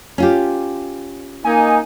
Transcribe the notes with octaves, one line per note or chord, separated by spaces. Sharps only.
C#4 F4 G4
A#3 D#4 G#5